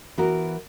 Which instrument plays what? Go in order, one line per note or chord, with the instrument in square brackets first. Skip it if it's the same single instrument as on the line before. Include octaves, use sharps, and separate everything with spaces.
[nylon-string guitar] E3 B3 F#4 A#4